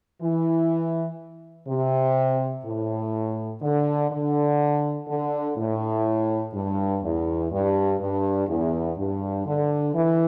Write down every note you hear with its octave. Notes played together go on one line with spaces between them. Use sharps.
E3
C3
A2
D3
D3
D3
A2
G2
E2
G2
G2
E2
G2
D3
E3